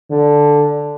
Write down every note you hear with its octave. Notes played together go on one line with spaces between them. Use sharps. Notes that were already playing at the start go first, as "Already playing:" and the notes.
D3